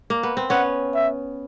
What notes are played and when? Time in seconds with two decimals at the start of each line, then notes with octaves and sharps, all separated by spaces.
0.10 A#3
0.23 B3
0.37 C4
0.50 B3 C#4 F#5
0.95 E5